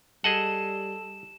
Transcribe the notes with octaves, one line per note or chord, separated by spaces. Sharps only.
G3 G#4 A4 D#5 F#5 A5 E7